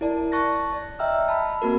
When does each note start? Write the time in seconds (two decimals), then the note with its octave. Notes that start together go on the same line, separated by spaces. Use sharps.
0.01 E4 A#4 D5 A5
0.32 A5 C#6 F#6 A6 A#6
0.73 D5
0.99 D#5 E5 G5 A#5 E6 F6
1.28 A5 B5
1.62 A#3 C4 F#4 A#4